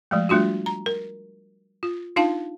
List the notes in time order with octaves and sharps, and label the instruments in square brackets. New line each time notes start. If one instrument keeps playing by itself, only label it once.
[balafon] F3 G#3 A3
G3 A3 D4 F4 F#4
A#5
A#4
F4
D4 D#4 F4 F5 A5